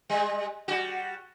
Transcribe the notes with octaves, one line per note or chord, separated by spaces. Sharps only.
G3 G#3
G3 F#4